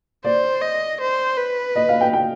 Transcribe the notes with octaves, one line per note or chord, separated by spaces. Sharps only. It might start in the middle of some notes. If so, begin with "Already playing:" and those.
C5 D5
D#5
C5
B4
D#5
F5
G5
G5